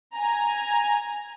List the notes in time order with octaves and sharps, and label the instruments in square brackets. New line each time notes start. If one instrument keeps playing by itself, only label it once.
[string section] G#5 A#5